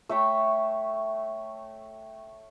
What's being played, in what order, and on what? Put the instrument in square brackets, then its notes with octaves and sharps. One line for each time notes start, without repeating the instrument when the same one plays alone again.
[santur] A3 C#5 E5 G5